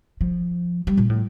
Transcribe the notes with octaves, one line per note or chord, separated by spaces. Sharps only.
F3
G3
A#2
A2